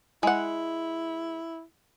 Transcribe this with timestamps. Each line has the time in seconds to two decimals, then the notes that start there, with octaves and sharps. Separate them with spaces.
0.23 G#3 E4 F#5